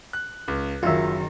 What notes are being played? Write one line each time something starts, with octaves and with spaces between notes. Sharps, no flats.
F#6
C#2
F#1 D#3 F#3 F4 E5